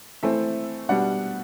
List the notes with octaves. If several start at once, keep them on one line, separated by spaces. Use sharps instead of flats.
E3 A3 C4 E5
B2 G3 D4 F#5